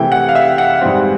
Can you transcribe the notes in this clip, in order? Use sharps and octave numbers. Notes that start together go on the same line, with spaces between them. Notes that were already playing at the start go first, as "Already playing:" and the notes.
Already playing: C3 E3 A3 G5
F#5
F5
E5
F#5
G#2 E3 G3 C4